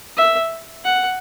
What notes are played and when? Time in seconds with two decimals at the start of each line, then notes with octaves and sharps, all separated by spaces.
0.17 E5
0.85 F#5